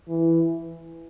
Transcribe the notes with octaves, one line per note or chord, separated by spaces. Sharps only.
E3